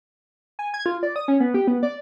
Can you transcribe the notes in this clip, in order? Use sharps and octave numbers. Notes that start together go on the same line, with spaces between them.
G#5
G#6
F4
D5
D#6
C#4
B3
G4
B3
D5